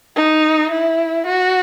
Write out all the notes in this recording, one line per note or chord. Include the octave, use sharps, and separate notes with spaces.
D#4
E4
F#4